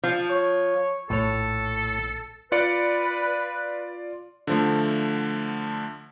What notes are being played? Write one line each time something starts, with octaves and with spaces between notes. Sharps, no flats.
F3
C#5
A#1 A2 A4 C#5
F4 B4 D5 C#7
D3 F3 A3